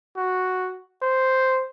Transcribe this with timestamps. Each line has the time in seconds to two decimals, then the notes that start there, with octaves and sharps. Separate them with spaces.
0.17 F#4
1.02 C5